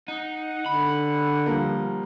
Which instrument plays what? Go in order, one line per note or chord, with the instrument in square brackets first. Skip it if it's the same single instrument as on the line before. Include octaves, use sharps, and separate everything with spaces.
[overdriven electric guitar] D#4 [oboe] F#5
[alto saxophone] D3 [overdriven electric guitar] B5
[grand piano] F3 G3 A#3